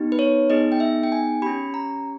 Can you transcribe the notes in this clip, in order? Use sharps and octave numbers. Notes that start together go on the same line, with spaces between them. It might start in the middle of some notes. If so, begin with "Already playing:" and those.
Already playing: B3 D#4 G4
B4
C#5
B3 D#4 G#4 D#5
G5
E5
G5
G#5
C#4 G4 B5
A#5